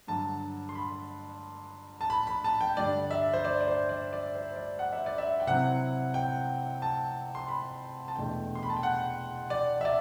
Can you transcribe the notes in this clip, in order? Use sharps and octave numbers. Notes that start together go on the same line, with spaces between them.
G2 D3 F#3 A5
C6
B5
A5
B5
B5
A5
G5
G2 D3 G3 D4 D5
E5
C5
D5
D5
C5
D5
D5
C5
D5
F#5
E5
D5
E5
G5
C3 F#3 C4 E4 F#5
G5
A5
C6
B5
A5
E2 B2 A3 D4 G5
C6
B5
A5
G5
F#5
D5
E5
D5